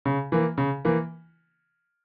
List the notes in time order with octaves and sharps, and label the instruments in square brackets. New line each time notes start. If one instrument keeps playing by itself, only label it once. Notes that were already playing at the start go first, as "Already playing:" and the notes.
[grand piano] C#3
E3 A#3
C#3
E3 A#3